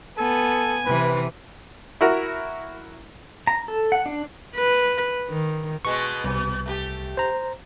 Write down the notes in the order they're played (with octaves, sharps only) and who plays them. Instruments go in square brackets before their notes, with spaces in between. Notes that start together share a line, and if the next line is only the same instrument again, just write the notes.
[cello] B3 [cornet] A4 [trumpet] G#5
[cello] C3 E3 [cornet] B4
[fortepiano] E4 F#4 A#4
[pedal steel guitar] A#5
A4
F#5
D4
[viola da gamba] B4
D#3
[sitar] B2 G#3 B3 [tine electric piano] C#6
[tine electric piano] C2 [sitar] B2
[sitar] A3 A#3 G4
[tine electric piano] C5 A#5